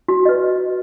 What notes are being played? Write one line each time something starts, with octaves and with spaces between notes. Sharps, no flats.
F#4
B4 D#5